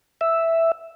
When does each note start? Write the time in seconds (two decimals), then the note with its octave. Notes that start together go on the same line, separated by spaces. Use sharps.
0.21 E5